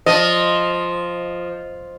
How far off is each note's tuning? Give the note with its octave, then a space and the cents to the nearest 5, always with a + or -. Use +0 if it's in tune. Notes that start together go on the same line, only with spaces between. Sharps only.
F3 +0 D#5 -5